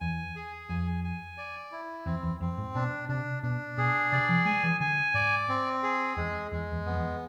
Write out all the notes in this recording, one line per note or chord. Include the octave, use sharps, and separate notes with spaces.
E2 G#5
G#4
F2 G#5
G#5
D5
E4
E2 C4
E2
F2 C4
G#2
B2 D4
C3 D4
B2 D4
B2 G#4
C3 D5
F3
G#3 G#5
E3
D3 G#5
G#2 D5
C4
G#4
E2 G#3
E2 G#3
E2
F2 B3
E2